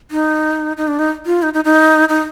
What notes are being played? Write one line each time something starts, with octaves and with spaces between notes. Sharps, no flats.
D#4
D#4
D4
D#4
F4
D#4
D#4
D#4
D#4